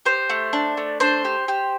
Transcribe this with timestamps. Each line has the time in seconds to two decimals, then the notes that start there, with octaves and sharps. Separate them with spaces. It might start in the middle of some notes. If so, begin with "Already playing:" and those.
0.05 G4 C5
0.30 A3
0.53 D4
0.77 A3
1.00 D4 C5
1.25 G4
1.48 G4